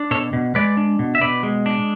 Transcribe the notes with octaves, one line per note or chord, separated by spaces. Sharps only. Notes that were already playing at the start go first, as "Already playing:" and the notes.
Already playing: D4
B2 A4 C#5
B2
G#3 B4 D5
D4
B2
E5
B2 B4 D5
G#3
D4